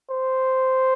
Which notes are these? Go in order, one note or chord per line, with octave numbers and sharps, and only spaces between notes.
C5